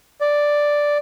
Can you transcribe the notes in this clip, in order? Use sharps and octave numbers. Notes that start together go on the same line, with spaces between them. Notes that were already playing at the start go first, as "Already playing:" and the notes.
D5